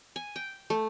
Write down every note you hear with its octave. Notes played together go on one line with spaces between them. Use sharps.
G#5
G5
A3